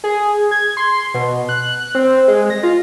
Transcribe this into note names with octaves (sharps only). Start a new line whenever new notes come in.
G#4
G#6
C6
B2
F#6
C4
G#3
A#6
F4